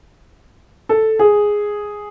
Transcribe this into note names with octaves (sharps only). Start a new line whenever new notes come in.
A4
G#4